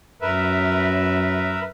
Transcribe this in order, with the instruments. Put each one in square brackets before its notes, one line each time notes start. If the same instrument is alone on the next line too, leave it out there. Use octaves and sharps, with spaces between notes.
[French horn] F#2 [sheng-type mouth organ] A#4 B4 E5